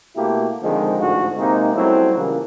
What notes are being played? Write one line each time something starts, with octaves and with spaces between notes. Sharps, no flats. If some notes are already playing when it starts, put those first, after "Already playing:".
B2 A3 A#3 E4 F#4 G4
F2 D3 D#3 F3 G#3
A1 D2 G#2 F3 A3 F#4
C3 G#3 A#3 C4 D#4
F#3 G3 A3 C4 C#4 E4
A#2 C#3 E3 G3 A#3